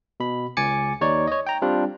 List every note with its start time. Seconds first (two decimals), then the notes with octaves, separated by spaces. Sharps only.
0.20 B2 B5
0.57 C#2 G#5 D6 A6 C#7
1.01 D#2 D#4 C#5 D5 C#6
1.27 C#5 D#5
1.47 G5 A#5
1.62 G3 C4 D4 F4